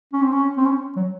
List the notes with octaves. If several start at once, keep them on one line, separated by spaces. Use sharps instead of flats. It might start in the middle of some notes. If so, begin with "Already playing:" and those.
C#4
C4
C#4
C4
C#4
F#3